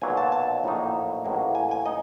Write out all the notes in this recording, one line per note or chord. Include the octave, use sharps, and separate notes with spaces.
B1 A#2 F#3 G#5
A5
A5
A#1 A2 F#3 A#3 D#4
A1 A2 F#3 A#3
G#5
G#5
D#4 D#5